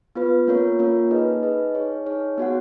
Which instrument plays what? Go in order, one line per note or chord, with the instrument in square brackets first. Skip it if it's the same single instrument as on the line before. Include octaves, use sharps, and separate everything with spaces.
[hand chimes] B3 F4 B4
A#3 C#4 F4 A#4 C#5
A#3 C#4 F4 A#4 C#5
D#4 G#4 B4 D#5
D#4 G#4 B4 D#5
D#4 G#4 C#5
D#4 G#4 C#5
B3 F#4 C#5 F#5